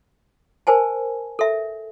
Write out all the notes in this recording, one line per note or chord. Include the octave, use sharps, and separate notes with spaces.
A#4 C5 G#5 A5
A4 E5